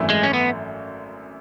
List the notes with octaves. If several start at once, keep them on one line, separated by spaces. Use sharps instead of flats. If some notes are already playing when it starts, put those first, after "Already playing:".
Already playing: G#1 F#2 E3 A3 E4
G#3
C#4
B3